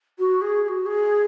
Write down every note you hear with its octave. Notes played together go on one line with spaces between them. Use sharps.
F#4
G#4
G#4
F#4
G#4